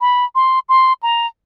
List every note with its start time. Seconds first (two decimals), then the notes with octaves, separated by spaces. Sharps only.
0.01 B5
0.35 C6
0.69 C6
1.03 A#5